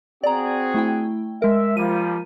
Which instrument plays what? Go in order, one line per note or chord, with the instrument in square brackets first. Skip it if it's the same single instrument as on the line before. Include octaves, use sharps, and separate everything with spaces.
[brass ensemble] C4 F#4 G#4 [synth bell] D5 A#5
[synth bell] A3 E4 G5
[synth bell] G#3 A#4 [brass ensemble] E5
[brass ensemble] F3 G3 A#3 [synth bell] D#7